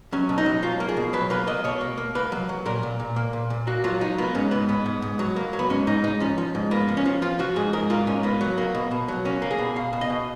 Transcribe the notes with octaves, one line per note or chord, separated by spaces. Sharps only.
F#3 C#4
B2
D#4
F#3
F#3 F4
A#3
G#4
B2
F#3 B4
A#3 B4
A#3 D#5
B2 C#5
A#3
A#3
A#3 B4
F#3
F#3
A#2 A#4
A#2
A#2
A#3
A#2
A#2
A#3 F#4
F#3 F4
F#3 D#4
A#3 B3
G#2 C#4
G#2 B3
G#2 B3
G#2
G#2
F#3
A#3
F#3
B3
G#2 C#4
G#2 D#4
G#2 D#4
F3 C#4
F3
G#2
A#3 B3
F3
C#4
F3
F3 F4
F3 F#4
G#2 G#4
G#2 A#4
A#3 F4
G#2 C#4
A#3 B3
F#3
A#3
B2
B2
F#3
A#3 C#4
A#3
G#4
B2
B2 F5
B2
D#5
B2